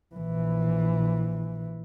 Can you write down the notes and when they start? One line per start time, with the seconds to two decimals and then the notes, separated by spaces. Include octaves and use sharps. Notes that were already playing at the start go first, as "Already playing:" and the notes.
0.15 A#1 E3